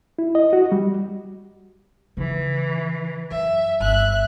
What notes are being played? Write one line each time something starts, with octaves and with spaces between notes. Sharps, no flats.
E4
D#5
F#4
G3
C#3 E3 D#4
F#2 E5
G1 E5 F#6